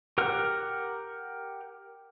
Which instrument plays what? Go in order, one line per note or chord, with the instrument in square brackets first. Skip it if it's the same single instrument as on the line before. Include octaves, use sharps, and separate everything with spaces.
[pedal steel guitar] G4 A#4 F#5 F6